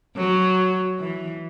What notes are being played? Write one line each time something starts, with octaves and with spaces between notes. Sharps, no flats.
F#3
E3